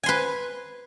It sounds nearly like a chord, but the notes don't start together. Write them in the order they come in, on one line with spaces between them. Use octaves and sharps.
G#5 C6 B4